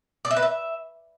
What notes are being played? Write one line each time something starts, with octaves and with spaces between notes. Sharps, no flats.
D5
E5
B4
E5